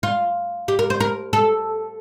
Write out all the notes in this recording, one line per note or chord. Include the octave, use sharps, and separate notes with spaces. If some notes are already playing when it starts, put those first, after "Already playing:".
F4
G4
A#4
C5
A#4
A4